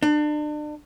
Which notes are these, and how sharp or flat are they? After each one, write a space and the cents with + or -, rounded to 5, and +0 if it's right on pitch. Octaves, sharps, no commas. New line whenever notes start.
D4 +35